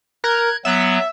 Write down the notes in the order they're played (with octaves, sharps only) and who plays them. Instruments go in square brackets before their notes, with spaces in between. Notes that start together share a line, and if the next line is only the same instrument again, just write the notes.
[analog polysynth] A#4 [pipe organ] F#6 G#6
[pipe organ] F#3 B3 [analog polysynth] E5